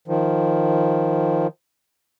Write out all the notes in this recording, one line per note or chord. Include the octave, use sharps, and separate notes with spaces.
D#3 F3